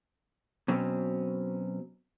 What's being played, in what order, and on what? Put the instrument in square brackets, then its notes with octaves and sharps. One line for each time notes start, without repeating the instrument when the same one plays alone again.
[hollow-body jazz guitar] B2 F#3 C4 C#4